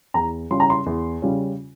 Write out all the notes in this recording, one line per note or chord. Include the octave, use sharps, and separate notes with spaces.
E2 A#5
C#3 G3 C#4 F4 C6
A#5
C6
E2
C#3 G3 C#4 F4